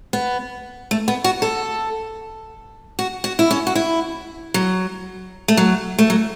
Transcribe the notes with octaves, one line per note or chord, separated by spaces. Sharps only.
B3
A3
B3
F#4
A4
F#4
F#4
E4
C#4
F#4
E4
F#3
A3
F#3
A3
F#3